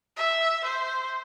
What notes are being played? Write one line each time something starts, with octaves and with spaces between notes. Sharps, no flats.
E5
C5